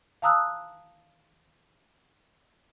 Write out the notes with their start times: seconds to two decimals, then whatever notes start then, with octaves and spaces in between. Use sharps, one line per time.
0.22 F5 A5 A#5 D#6 E6 F#6